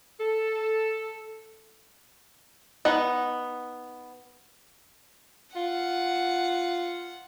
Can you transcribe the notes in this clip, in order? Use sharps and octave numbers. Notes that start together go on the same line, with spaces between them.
A4
B3 D#4 F#5
F4 F#5